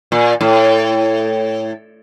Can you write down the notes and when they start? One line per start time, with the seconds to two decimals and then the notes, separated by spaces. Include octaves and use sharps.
0.12 A#2
0.41 A2